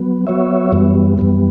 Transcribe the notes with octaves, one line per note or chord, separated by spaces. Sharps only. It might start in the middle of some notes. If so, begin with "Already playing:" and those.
Already playing: F#3 B3
F#3 B3 F#4 C#5 E5
F#2 E3 G3 B3
F#2 E3 G3 B3